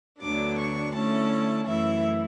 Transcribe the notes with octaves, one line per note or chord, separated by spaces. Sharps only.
D2 D3 F#3 B3 D4 D6
C#6
D3 A3 C#4 E4 A5
F#2 E3 A3 E4 E5